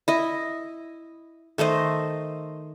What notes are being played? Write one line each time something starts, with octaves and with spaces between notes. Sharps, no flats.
E4 D#5
D#3 A3 C5 D#5